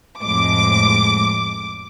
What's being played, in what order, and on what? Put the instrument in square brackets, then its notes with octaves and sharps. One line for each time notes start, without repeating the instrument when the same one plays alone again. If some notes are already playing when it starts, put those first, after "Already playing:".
[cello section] F2 A2 G#3 [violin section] D6